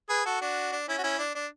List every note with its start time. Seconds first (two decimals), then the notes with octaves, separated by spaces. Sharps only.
0.09 G#4 B4
0.25 F#4 A4
0.41 D4 F#4
0.72 D4
0.88 C#4 E4
0.98 F#4
1.03 C#4 E4
1.19 D4
1.35 D4